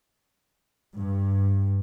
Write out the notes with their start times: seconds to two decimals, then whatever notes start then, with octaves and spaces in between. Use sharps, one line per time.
0.93 G2